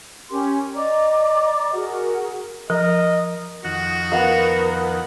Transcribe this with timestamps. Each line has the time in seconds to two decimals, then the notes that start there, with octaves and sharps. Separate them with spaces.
0.30 C#4 G4 A#4 C6
0.75 D5 D#5 A#5 D6
1.73 F#4 G#4 A#4 F#5
2.70 F3 A#4 D#5
3.64 F2 D#3 F#4 F#5
4.12 B3 A#4 B4 F5